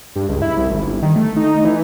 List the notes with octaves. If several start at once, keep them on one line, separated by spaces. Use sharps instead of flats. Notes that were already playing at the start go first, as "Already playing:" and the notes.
G2
C#2
E4
C2
G#1
G1
D#3
A3
D#4
E3